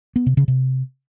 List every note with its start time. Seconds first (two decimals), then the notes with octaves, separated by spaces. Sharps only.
0.16 B3
0.26 C3
0.37 C#3
0.48 C3